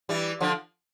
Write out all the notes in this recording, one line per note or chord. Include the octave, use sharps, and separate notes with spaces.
E3 G3
D3 F3